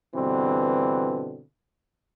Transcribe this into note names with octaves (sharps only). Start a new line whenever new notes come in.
G2 B2 D3 E3 C4